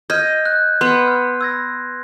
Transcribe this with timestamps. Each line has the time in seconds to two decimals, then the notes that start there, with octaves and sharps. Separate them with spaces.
0.10 D#5 F6 G6 G#6
0.45 F#6
0.81 B3 C6 C7
1.07 F6
1.41 E6 G#6 A#6